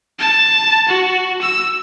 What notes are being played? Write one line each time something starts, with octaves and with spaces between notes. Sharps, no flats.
A5
F#4
E6